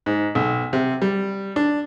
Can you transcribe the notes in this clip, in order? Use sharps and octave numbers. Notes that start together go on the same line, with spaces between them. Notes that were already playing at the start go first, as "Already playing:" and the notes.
G#2
B1
C3
G3
D4